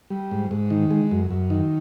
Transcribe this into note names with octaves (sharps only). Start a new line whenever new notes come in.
G3
G#2
G#2
D#3
G#3
F#2
F#2
D#3